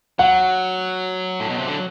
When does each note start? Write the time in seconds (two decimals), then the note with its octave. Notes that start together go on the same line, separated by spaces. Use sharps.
0.19 F#3 F#5
1.40 A2
1.49 B2
1.58 C3
1.67 D3